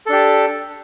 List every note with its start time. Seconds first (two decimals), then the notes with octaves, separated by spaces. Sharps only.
0.06 A4
0.09 D4
0.12 G4